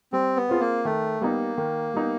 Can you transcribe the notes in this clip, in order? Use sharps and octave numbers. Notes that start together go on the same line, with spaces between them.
G3 C4
B3
C4 F4 G#4
A#3
D#3 A3
G3 A#3 B3 D#4
D#3
G3 B3 D#4